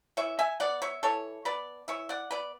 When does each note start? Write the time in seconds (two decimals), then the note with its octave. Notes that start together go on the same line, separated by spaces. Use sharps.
0.17 E3 C#5 E5
0.39 E5 G#5
0.60 B3 D5 F#5
0.82 C#5 E5
1.03 E3 A4 C#5
1.45 B3 B4 D5
1.88 E3 C#5 E5
2.09 D5 F#5
2.31 B3 B4 D5